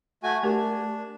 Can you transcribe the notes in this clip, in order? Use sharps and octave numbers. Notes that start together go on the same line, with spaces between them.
A3 F#4 G#5
A3 D4 G4 A#4